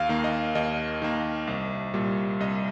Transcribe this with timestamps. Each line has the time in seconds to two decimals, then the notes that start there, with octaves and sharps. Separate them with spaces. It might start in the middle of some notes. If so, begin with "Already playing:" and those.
Already playing: D#2 F5 F6
0.09 D#3 A#3
0.24 D#5
0.55 D#2 D#5
1.02 D#3 A#3
1.47 C2
1.94 A#2 G3
2.40 C2 D#5